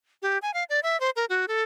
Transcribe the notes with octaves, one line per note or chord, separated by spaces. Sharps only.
G4
G#5
F5
D5
E5
C5
A#4
F#4
A4